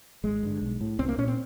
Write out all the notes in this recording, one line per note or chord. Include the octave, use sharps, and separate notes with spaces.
G#1 G#3
G2 D3
B1
A2
C2 C4
A#3
A#2 C#4
C4